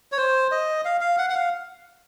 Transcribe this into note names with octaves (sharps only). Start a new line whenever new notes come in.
C#5
C5
D#5
F5
F5
F#5
F#5
F5